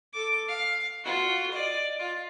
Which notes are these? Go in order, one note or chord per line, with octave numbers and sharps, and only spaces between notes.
A4 D6
F5
F4 F#4
D5 D#5
F4